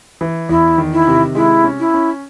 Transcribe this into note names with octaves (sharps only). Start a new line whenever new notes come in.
E3
E2 E4
D#3
E4
C3
G#3 E4
C#4
E4
C#4